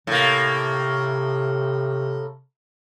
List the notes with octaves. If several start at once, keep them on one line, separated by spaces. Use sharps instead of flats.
A2 C3 A#3